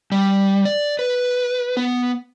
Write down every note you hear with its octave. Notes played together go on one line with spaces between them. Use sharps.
G3
D5
B4
B3